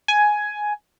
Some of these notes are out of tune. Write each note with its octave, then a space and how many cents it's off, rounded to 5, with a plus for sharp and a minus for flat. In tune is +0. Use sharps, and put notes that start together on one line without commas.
G#5 +10